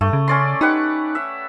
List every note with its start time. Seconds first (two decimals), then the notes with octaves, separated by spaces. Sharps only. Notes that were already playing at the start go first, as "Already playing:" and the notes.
0.01 G2 A3
0.13 C#3
0.28 C#4 D5 C6
0.61 D#4 G4 B4 F#5
1.15 E5